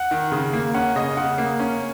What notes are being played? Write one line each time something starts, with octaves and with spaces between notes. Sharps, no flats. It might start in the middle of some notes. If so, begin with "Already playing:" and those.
Already playing: F#5
D#3
C#3
A#3
C#4 F#5
C#3 D#5
C#3 F#5
A#3
C#4